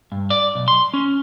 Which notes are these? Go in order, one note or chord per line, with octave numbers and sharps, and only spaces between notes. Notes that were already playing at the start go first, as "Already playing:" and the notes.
G2
D5
B1
C6
C#4